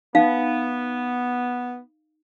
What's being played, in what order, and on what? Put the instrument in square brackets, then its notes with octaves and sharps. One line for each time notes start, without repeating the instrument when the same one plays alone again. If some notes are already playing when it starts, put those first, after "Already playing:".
[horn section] B3 [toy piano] D#4 F5